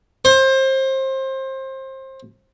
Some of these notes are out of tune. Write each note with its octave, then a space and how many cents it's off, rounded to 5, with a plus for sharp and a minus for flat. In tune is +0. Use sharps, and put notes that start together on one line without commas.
C5 +25